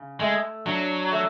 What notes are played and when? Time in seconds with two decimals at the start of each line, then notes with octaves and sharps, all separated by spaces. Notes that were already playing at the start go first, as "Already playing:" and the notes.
Already playing: C#3
0.20 G#3 A3
0.66 F#3 D4
1.12 A3